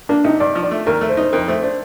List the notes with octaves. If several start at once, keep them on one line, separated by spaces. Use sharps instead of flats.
A#3 D4
C3 D#4
G2 D5
F3
D5
A3
D#2 A#4
A3
C5
D#4
C5
F2 A#4
A3 C5
D4 C5